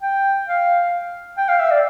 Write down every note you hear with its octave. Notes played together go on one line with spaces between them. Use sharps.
G5
F5
G5
F5
E5
D5